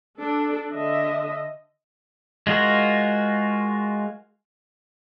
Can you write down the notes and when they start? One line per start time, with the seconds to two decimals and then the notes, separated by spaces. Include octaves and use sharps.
0.18 D4 A4
0.72 D3 D#5 E5
2.47 G#3 F4 F#4 A#4